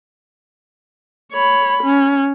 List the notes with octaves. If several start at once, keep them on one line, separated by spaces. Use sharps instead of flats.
C#5 B5
C#4